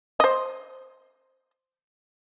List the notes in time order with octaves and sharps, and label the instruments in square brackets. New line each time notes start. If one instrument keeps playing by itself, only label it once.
[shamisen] C5 D#5